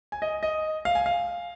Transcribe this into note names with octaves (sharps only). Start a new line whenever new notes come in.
G#5
D#5
D#5
F5
G#5
F5